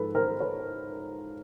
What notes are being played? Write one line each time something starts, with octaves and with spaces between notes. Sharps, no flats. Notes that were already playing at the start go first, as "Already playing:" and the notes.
Already playing: G#2 F3 A4 B4
A#4 C5
B4 C#5